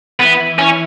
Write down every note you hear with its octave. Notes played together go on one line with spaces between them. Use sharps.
E3 B3 E4
C#4